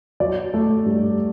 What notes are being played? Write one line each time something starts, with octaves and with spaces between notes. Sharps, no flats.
F#3 D5
A3
G2